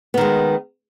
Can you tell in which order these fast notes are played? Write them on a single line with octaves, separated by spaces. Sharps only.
B3 D#3 G#3